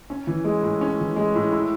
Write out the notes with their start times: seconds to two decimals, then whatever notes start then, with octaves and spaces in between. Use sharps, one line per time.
0.10 C#4
0.27 E3
0.45 G#3
0.63 A2
0.81 C#4
0.99 E3
1.16 G#3
1.35 A2
1.52 E4